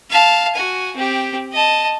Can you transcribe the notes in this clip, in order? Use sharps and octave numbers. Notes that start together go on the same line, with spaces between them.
F5 A5
F#4 G#5
C4 G4
D#5 A5